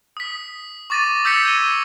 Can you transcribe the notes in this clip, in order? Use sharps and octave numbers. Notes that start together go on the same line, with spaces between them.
D#6 B6
C#6 D6 A6 A#6 D#7
D#6 E6 G6 A#6 B6 C#7
G#6 D#7 G7